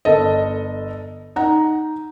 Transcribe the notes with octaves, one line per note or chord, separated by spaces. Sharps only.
G1 A4 D#5
D#4 F#5 A#5